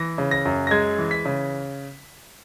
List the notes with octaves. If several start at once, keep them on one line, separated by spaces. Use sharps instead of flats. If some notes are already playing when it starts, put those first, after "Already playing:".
Already playing: E3 A#6
C#3
A#6
F#2
A#6
G#3 G#6
E3
B6
C#3